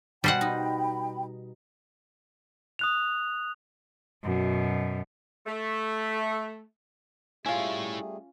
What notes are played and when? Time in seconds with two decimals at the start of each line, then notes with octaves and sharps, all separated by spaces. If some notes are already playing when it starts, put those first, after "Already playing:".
0.24 B2 G3 C5 F#5 G5 B5
0.41 D#4
2.79 D#6 F#6 F7
4.24 F#2 B2
5.46 A3
7.46 G3 A3 C#4 E4 F4 G#4 C#5